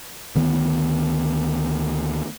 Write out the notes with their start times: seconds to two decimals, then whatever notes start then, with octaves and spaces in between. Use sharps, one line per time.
0.36 D2 D#3 B3